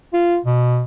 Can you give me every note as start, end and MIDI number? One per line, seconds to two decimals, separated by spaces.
0.13 0.37 65
0.46 0.85 47